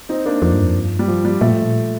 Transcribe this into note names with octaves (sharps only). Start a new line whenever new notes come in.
C4 D#4
A#3 D4
F2 F3
G2
F2
G2
G3
F3
G3
A#2 F3 A3
A2
A#2